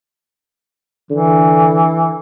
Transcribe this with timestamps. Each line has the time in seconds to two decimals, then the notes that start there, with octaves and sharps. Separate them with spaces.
1.11 D3 E3